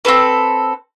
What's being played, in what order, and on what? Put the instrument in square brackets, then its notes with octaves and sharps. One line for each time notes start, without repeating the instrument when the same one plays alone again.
[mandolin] C4 F4 A4 B4